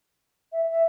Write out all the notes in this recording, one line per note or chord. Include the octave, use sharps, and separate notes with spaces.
E5
E5